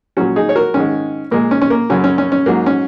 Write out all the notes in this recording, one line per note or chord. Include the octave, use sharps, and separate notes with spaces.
A#2 F#3 C#4 F#4
D#4 G#4
C#5
F#4 A#4
G#2 D#3 G#3 C#4
A#2 G#3 A#3
C#4
C#4
A#3
F#2 C#3 F#3 C#4
C#4
C#4
C#4
G#2 F#3 A#3
C#4